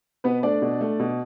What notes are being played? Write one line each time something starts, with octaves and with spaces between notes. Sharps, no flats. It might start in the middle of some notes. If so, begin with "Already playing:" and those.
B2 B3 B4
A3 D4 D5
B2
A3
B2